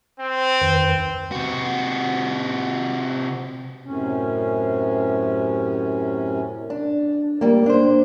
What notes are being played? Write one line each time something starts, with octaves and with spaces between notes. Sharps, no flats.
C4
F2 D#3 B4
C3 F#4
F#2 A2 C3 C#4
D4
D2 G3 A#3
D4 C5